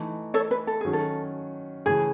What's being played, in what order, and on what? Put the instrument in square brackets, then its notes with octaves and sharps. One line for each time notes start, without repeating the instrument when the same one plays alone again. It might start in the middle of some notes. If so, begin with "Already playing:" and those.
Already playing: [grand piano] E3 A3 D#4
[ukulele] A4 C#5
B4
A4
[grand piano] D#3 F#3 C#4 [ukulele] G#4
[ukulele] A4
[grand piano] C#3 E3 A3 [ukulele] G#4